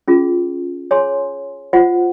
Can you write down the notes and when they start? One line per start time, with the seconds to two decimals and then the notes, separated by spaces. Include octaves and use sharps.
0.08 C#4 F4 G#4
0.91 G#4 C#5 G#5 C6
1.73 F4 C5 F#5